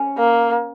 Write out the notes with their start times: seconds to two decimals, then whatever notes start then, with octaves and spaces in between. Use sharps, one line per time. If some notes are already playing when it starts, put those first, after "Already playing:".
Already playing: C#4
0.17 A#3